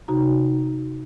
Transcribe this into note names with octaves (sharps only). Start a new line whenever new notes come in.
C3 D#4 F#4 A#5